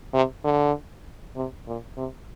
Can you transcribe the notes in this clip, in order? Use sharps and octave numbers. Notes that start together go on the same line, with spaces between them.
C3
D3
C3
A#2
C3